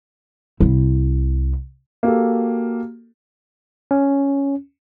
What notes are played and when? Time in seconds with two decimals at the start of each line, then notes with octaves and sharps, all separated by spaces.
0.60 C2 E4
2.03 A#3 F#4 G4 A4
3.91 C#4